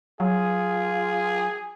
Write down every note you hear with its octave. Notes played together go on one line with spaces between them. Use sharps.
F#3 F4 G#4